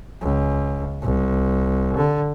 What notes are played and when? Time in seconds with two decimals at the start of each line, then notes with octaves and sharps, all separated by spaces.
0.22 C#2
1.03 C2
1.97 D3